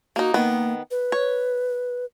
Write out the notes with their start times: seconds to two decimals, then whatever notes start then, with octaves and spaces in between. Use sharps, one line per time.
0.16 A#3 D#4 F#4
0.34 D#3 A#3 B3
0.91 B4
1.12 C#5